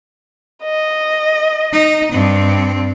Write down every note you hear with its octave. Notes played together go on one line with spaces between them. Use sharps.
D#5
D#4
G2 C4